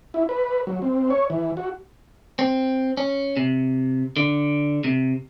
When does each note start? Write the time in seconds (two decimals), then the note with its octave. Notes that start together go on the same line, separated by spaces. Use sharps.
0.14 E4
0.29 B4
0.67 F#3
0.82 C4
1.10 C#5
1.30 E3
1.57 F#4
2.39 C4
2.97 C#4
3.37 C3
4.16 D3
4.84 C3